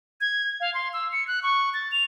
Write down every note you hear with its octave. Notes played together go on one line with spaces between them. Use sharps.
G#6
F5
C6
E6
C#7
F#6
C#6
A6
F7